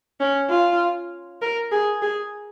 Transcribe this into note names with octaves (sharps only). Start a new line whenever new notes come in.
C#4
F4
A#4
G#4
G#4